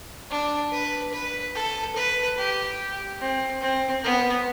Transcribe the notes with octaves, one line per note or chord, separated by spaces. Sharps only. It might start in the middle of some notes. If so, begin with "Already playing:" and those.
D4
B4
B4
A4
B4
G4
C4
C4
B3